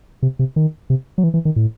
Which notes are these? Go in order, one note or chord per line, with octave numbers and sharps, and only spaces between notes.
C3
C3
D#3
C3
F#3
E3
E3
D#3
A2